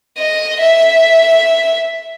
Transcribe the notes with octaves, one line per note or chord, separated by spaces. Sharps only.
D#5
E5